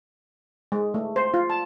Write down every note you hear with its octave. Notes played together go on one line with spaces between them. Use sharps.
G#3
A3
C5
F4
A5